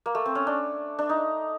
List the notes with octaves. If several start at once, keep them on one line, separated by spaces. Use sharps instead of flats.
A#3
A3
C4
C#4
D4
D4
D#4